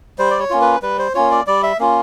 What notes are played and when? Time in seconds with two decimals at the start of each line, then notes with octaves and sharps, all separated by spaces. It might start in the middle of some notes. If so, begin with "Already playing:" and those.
0.19 G3 C5
0.31 D5
0.40 C#5
0.50 A#3 C#4 F4
0.61 B4
0.82 G3 B4
0.99 C5
1.15 A#3 C#4 F4 C#5
1.31 D5
1.47 G3 D5
1.63 E5
1.79 A#3 C#4 F4